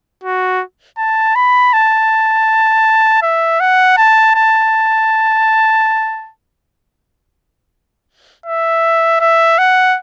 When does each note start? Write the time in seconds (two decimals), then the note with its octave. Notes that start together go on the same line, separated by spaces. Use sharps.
0.24 F#4
0.98 A5
1.36 B5
1.73 A5
3.22 E5
3.60 F#5
3.97 A5
4.35 A5
8.46 E5
9.21 E5
9.58 F#5